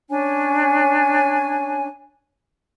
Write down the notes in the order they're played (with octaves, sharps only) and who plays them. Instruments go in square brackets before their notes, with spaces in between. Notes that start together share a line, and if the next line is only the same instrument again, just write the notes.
[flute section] C#4 D4 C#5 G#5